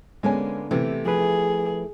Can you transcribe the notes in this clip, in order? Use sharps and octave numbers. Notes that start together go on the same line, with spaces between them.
D3 G#3 A#3 B3 C#4 G#5
C3 E3 A3 E4 G4
F3 G#4 B4